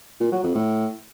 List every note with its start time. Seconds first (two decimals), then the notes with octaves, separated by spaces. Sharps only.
0.20 A#2
0.32 F#3
0.43 F2
0.55 A2